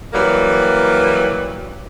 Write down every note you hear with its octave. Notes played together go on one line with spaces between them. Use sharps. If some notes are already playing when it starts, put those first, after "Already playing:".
E3 F#3 G3 A#3